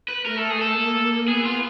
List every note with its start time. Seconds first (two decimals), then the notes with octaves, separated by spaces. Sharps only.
0.08 B4
0.25 A3 A#4
0.37 A4
0.50 G#4
0.61 A4
0.77 A#3
1.28 B3 G#4
1.45 F4